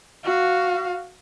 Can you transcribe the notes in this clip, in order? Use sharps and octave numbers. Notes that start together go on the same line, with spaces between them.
F#4 F5